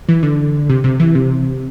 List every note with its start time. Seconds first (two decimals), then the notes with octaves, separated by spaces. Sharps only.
0.09 E3
0.23 D3
0.69 C3
0.84 C3
1.00 E3
1.15 C3